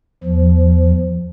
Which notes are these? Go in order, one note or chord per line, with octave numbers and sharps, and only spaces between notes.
E2 F3